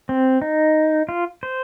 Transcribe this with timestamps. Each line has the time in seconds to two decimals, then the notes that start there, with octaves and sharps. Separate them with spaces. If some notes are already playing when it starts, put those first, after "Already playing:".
0.09 C4
0.42 D#4
1.09 F4
1.43 C5